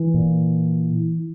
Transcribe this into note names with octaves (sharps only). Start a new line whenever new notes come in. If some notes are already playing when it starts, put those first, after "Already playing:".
Already playing: E3
A#2